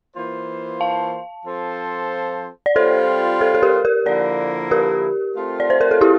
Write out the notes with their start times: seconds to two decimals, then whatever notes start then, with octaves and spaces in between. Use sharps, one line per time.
0.15 E3 A#3 F4 C5
0.81 F5 A5
1.45 F3 C4 F4 A4 C5
2.66 D5
2.76 G3 C4 F4 A4 C5
3.41 A4 C5
3.54 A4
3.62 G4 A#4
3.85 G4 A#4
4.06 D3 F3 A#3 E4 A#4 D5
4.71 G4 A#4
5.36 A3 C4 F4
5.60 D5
5.70 C5
5.81 A#4
5.91 A4
6.01 E4 G4